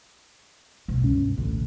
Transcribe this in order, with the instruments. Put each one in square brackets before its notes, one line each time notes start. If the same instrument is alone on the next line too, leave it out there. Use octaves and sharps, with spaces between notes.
[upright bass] B2
[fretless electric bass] C#2 G2 C#4
A1 D2